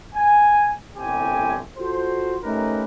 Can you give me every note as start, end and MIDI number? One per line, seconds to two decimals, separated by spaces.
0.15 0.71 80
0.97 1.60 31
0.97 1.60 36
0.97 1.60 45
0.97 1.60 60
0.97 1.60 67
0.97 1.60 80
1.78 2.36 65
1.78 2.36 66
1.78 2.36 69
1.78 2.36 72
2.43 2.85 57
2.43 2.85 61
2.43 2.85 63
2.43 2.85 67
2.43 2.85 70
2.43 2.85 71